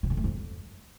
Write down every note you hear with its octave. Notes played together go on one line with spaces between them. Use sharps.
C3
D3
A3
F2